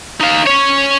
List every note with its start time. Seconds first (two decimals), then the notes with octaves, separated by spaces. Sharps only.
0.20 D#4 F5
0.46 C#4 C#5